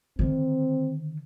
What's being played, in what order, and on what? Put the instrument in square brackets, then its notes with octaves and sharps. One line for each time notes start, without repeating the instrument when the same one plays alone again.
[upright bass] D3 D#3 [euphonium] C4